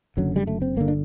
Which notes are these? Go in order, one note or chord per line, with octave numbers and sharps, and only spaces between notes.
F#1 F#2 D3 F#3
G3
A3
C4
G1 D3 A#3
D4